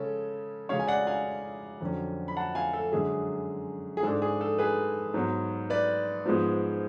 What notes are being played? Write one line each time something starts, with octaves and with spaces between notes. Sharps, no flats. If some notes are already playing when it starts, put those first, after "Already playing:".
Already playing: C#3 G#3 C#4 A4
C#3 G#3 C#4 C#5 F5
G#5
D5 F#5
F5 G#5
F2 D3 F#3 C#4
B5
F#5 A5
F5 G#5
A4
F#2 D3 G#3 C#4 G#4
G#4
G#2 G#3 D4 A4
G#4
A4
G#4 B4
G#2 F#3 B3
B4 D5
G#2 F3 G#3 B3